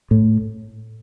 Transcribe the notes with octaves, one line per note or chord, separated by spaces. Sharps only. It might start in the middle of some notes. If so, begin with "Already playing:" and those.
A2